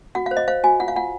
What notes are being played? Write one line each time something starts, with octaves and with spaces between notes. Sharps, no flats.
F#4 F#5
C5 F5
D#5
C5 F5
F#4 G#5
F4 F#5
F5
F4 F#5